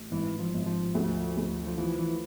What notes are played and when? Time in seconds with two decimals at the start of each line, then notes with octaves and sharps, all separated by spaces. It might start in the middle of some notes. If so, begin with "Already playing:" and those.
Already playing: A1
0.11 G#1 E3
0.39 F3
0.54 G#1
0.66 F3
0.95 D2
1.37 D2
1.67 F3
1.78 E3 F3
1.99 E3